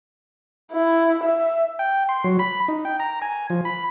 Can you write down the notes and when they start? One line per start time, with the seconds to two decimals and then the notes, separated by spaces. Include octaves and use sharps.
0.72 E4
1.23 E5
1.79 G5
2.09 C6
2.24 F#3
2.39 B5
2.68 D#4
2.85 G5
3.00 A#5
3.22 G#5
3.50 F3
3.65 B5